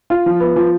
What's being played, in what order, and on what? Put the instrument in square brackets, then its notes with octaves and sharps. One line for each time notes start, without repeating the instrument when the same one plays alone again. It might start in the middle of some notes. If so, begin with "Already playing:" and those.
[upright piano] F4
F3
B3
F3